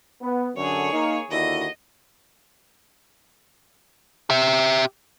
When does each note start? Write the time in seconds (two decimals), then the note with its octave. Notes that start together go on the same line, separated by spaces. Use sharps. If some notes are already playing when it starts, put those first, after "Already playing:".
0.21 B3
0.56 F#2 D3 G#4 C#5
0.92 A#3 D#4
1.30 D#2 D3 E4 F#4 D#5
4.30 G4 E5